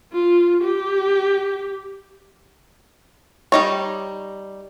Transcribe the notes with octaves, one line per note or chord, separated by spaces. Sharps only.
F4
G4
G3 D#4 C#5